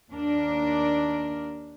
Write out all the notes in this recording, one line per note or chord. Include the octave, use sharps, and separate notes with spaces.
D#2 D4 A#4